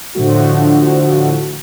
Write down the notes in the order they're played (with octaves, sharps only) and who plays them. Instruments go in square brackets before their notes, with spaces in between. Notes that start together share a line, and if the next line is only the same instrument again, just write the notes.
[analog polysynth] A2 D3 F3 A3 F#4